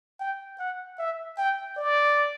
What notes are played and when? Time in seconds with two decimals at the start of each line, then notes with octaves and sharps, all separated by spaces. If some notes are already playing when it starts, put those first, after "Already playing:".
0.20 G5
0.60 F#5
0.99 E5
1.38 G5
1.77 D5